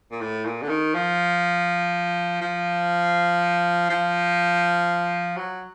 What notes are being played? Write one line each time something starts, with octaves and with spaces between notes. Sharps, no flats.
A#2
A2
A#2
D3
D#3
F3
F3
F3
F#3